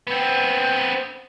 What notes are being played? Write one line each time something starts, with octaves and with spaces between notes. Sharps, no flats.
B3 C4